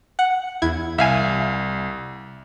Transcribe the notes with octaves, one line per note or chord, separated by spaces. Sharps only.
F#5
E2 E4 G#6
C2 E5 F5 G#5